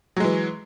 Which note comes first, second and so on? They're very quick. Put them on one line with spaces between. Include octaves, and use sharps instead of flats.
F#3 G#3 E3